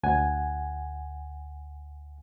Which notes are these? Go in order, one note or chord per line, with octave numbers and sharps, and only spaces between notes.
D2 F#5 G#5